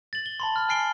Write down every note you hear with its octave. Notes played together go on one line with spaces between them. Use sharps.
A6 F#7
G7
A5 B5 C6
B5 F6
G#5 F6 C7 D7 G7